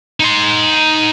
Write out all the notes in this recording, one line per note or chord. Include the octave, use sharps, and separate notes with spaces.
D#4 C6